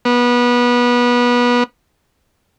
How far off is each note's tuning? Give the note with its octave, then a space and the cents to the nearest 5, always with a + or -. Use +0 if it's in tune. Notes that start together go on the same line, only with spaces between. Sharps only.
B3 -25